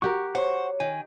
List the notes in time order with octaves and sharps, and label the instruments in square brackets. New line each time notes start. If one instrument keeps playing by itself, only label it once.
[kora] F#4 G4 A#4 [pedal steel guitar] C#6
[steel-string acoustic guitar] C5 [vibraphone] C#5 [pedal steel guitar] F#5 C#6
[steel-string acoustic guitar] D#3 [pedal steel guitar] G#5